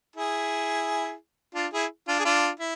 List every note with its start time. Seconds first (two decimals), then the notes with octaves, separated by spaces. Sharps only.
0.16 E4 G#4
1.55 D4 F4
1.73 E4 G#4
2.08 D4 F4
2.20 G#4
2.25 D4 F4
2.60 E4